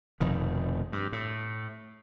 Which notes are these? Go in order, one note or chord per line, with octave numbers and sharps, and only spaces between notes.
F1 F2 B2 D#3
G2
A2